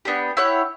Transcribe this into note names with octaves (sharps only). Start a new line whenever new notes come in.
B3 D4 G4
E4 G4 C#5 F#5